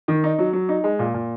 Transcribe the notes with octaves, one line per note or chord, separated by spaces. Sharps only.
D#3
D#4
F#3
F#3
D#4
G#3
A#2
A#2